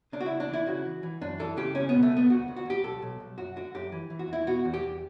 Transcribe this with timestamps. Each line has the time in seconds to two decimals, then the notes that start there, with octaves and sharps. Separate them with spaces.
0.12 C#3 D4
0.20 F#4
0.26 E4
0.31 C#2
0.40 D4
0.49 E3 E4
0.66 C#3 F#4
0.85 E3
1.03 E3
1.21 F#2 D4
1.39 E3 A4
1.57 C#3 G4
1.75 C#2 C#4
1.89 B3
1.94 B2
2.03 A3
2.12 C#2 B3
2.30 D2 F#4
2.48 D2
2.56 F#4
2.66 D2 G4
2.84 B1 A4
3.02 B1
3.20 B1
3.38 F#2 F#4
3.56 D3 F#4
3.74 F#2 G4
3.92 E3
4.10 E3
4.19 F#4
4.28 E2 E4
4.47 B2 F#4
4.65 E2
4.74 G4
4.83 E2